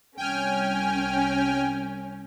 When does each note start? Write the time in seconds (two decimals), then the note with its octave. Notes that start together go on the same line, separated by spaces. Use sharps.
0.17 C2 C#4 G5 G#5 F6